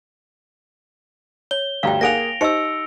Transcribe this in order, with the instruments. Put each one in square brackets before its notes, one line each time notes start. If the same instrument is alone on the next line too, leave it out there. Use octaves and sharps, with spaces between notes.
[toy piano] C#5 [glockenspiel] G7
[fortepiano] D2 G2 A#5 [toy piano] F5 G5
[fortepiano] A#3 G#4 F#5 [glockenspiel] A#6 D7 F7
[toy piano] D#4 G4 D#5 [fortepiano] C5 [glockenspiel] E6 C#7